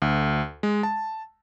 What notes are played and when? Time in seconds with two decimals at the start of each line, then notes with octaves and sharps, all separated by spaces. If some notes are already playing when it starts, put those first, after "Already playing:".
0.02 D2
0.63 G#3
0.83 A5